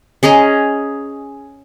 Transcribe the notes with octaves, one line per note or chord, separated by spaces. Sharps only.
C#4 G#4 D#5 A#5